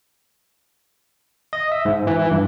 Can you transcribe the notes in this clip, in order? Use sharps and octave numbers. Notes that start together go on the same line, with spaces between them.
D#5
E5
G#2
E3
E3
G2